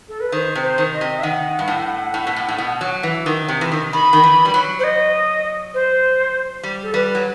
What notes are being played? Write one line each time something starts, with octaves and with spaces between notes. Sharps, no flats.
A4
B4
D#3 C5
C3
C5
D#3
D#5
C3
E5
D#3 F#5
G2
A2
A2
B2
A2
A2
B2
F#3
E3
D#3
C3
E3
D#3
D#3 B5
D#3
E3
G3
F#3
C5
D#5
C5
G3
A4
G3 B4
F#3